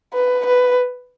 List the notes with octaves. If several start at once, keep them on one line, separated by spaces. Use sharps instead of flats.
B4
B4